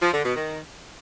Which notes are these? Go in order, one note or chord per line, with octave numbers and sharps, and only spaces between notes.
F3
D3
B2
D#3